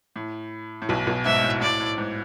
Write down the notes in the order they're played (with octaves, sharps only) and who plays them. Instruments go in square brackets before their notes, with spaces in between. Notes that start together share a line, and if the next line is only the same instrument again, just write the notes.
[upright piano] A2
A2
B1 B2
B1 B2
[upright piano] G#2 [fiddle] E5
[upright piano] A2
[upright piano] A2 [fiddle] D5
[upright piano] A2
G#2